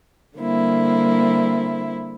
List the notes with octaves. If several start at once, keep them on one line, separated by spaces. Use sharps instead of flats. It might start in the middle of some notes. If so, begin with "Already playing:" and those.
D3 G3 A#3 C4 E4